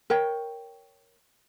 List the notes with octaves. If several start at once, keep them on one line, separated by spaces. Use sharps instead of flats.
A#4 C#5 G5